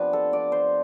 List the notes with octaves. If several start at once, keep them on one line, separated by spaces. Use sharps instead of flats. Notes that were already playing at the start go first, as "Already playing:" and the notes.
Already playing: C3 F3 B3 D4 B4
A4
D5
C5